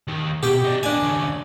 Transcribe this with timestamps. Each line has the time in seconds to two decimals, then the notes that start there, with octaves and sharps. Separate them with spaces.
0.08 D#2 D#3
0.43 B2 G4 G5
0.64 D#4 D5
0.83 A#3 D4 G4 G#5
1.03 D#2 C#3